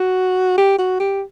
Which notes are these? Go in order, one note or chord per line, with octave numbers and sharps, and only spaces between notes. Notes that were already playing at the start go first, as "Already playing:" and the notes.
Already playing: F#4
G4
F#4
G4